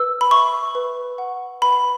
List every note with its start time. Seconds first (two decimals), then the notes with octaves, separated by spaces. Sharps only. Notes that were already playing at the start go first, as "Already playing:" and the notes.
Already playing: B4 E6
0.21 B5
0.31 E5 C#6
0.75 B4
1.18 F#5
1.62 B4 B5